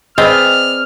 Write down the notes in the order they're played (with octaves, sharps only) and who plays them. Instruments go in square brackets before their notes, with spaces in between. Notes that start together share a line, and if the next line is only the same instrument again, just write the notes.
[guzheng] C4 [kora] G#4 B4 D5 [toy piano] D#5 [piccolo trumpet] F6